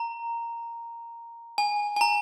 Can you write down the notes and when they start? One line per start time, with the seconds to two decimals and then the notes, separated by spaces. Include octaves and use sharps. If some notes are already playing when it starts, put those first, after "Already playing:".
Already playing: A#5
1.58 G#5
1.96 G#5
2.01 A#5